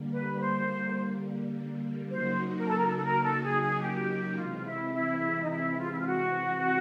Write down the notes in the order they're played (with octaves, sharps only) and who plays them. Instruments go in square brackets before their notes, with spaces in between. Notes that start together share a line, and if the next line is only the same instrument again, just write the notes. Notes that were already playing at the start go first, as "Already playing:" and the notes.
Already playing: [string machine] D3 G3 A#3
[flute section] B4
C5
[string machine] C#3 F#3 A#3 D#4 F#4 [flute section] C5
[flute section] A#4
A4
A#4
A4
A4
A#4
A4
G#4
G#4
G4
[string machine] C3 E3 G#3 C4 [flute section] F4
[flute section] E4
E4
D#4
E4
F4
E4
F4
F#4